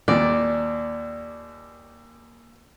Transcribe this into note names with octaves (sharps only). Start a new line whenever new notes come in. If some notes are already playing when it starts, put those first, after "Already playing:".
D#2 A#2 D5